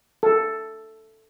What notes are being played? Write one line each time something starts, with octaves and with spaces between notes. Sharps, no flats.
A4